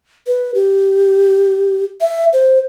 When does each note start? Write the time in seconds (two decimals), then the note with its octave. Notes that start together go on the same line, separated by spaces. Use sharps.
0.27 B4
0.55 G4
2.01 E5
2.33 C5